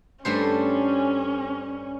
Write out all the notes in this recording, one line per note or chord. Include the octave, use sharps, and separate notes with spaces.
G2 A3 C#4 C5